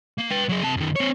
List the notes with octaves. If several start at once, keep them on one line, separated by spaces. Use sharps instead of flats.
A#3
B4 G5
F#3 G#4
C3 A5
F#2 D#3
C4 C#5